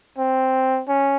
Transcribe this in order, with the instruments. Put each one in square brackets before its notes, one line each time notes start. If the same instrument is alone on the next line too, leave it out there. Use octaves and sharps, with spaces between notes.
[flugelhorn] C4
C#4